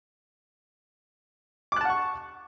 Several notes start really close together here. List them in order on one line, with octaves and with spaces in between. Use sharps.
D6 F#6 A5 F#5 C#6